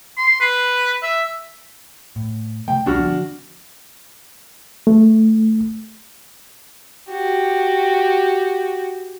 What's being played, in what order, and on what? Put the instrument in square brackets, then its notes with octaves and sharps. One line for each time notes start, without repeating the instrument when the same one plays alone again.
[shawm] C6
B4
E5
[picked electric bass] A2
[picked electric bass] C3 G#3 A3 [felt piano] G5
[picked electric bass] D#1 B1 G3 [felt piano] D4 F#4 F6
[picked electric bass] D3 F3 B3
[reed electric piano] A3
[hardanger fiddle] F#4 G4